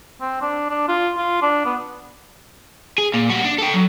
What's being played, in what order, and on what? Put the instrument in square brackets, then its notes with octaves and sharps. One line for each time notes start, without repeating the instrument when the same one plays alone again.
[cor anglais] C4
D4
D4
F4
F4
D4
B3
[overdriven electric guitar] G#4
A#2
G3 F#4
D4
A4 G5
F#3